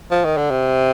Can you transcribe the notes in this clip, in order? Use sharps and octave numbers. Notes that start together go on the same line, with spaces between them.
F3
D#3
D3
C3